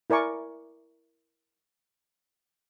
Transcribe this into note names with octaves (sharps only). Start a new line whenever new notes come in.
E4 A#4 D5 G#5 C#6 D6